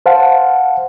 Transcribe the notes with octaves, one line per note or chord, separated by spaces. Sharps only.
C5 F5 F#5 A5